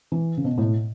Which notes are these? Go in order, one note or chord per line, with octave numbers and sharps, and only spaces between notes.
E3
C#3
B2
A2